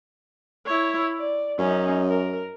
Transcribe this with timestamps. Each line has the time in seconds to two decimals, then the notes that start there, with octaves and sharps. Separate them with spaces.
0.66 E4 C#5
1.17 D5
1.59 F#2 C#4 D#4
2.09 A#4